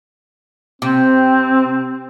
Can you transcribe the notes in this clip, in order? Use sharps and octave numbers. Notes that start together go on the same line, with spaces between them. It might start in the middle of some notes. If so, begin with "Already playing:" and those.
C3 C4